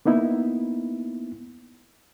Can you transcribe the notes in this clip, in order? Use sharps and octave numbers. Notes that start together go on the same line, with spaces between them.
A#3 B3 D#4 E4